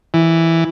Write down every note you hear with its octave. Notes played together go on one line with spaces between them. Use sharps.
E3